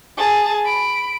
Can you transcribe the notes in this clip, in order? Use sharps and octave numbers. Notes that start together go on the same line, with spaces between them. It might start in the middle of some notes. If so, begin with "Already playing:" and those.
G#4 A5
B5 D7